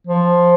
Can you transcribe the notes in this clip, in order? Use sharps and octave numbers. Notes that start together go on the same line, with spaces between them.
F3